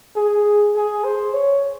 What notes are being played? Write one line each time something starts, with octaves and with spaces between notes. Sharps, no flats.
G#4
G#4
C5
C#5